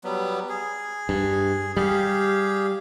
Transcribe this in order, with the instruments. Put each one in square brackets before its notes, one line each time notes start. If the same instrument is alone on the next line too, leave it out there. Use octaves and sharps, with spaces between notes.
[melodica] F#3 G3 B3
G#4
[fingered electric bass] G2
[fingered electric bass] G3 [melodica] G4 G#4 F5